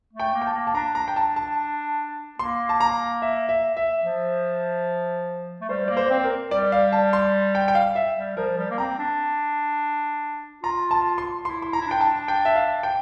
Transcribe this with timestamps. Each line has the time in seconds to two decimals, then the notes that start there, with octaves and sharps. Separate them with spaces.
0.13 A3
0.19 G5
0.34 A#3
0.41 G5
0.47 A5
0.55 A#3
0.67 A5
0.75 D4 A#5
0.95 A#5
1.08 G5
1.16 A5
1.36 A5
2.39 A#3 C6
2.69 A5
2.80 A#5
3.22 E5
3.49 E5
3.77 E5
4.04 F3
5.61 A3
5.69 G3 C5
5.88 A#3 D5
5.97 C5
6.10 C4
6.17 C5
6.24 A#4
6.51 G3 D5
6.72 F5
6.92 A5
7.13 C6
7.55 G5
7.68 G5
7.75 F5
7.95 E5
8.16 G3
8.37 F3 A#4
8.58 G3
8.71 A#3
8.78 C4 A#5
8.99 D4
10.63 F4 A#5
10.91 A5
11.18 C6
11.45 E4 C6
11.62 C6
11.73 A#5
11.80 E4
11.87 D4 G5
12.01 A5
12.28 G5
12.45 E5
12.56 F5
12.83 G5